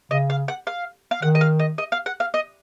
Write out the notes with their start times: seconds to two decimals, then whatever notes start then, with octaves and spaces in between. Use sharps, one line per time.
0.11 C#3 D#5
0.30 F5
0.48 F#5
0.67 F5
1.11 F5
1.22 D#3 F#5
1.35 D#5
1.41 F5
1.59 D#5
1.78 D#5
1.92 F5
2.06 F#5
2.20 F5
2.34 D#5